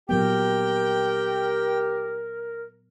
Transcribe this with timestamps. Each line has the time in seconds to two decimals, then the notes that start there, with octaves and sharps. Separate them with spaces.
0.09 A#2 F#3 B3 G4 A#4 G5